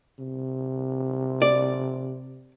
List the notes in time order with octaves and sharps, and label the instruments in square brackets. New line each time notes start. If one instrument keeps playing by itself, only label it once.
[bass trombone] C3
[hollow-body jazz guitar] D5